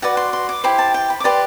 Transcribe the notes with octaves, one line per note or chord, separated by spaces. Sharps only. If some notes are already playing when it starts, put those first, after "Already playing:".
F#4 B4 D5 F#5
C6
C6
D6
E4 G4 C5 B5
A5
G5
B5
D6
G4 B4 D5 C6